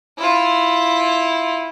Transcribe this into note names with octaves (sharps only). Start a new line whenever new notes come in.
E4 F4